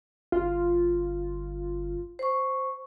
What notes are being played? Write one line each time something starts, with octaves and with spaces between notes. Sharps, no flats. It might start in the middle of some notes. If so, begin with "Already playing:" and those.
G1 F4
C5 C#6